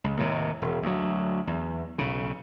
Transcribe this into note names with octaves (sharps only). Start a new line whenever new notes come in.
C#2
D#2 A2 C3
E1
D2 F#3
E2
B1 C#3